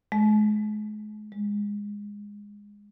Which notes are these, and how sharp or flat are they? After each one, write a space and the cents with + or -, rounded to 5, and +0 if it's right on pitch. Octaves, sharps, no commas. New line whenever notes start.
G#3 +35
G#3 -15